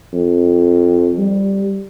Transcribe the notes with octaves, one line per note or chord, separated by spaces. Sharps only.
F2
G3